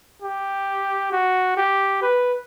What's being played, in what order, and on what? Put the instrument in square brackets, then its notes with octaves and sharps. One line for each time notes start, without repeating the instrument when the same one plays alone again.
[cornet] G4
F#4
G4
B4